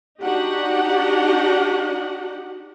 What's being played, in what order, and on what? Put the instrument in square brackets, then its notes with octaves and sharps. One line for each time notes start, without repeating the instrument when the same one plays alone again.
[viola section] D4 D#4 F#4 G4 F#5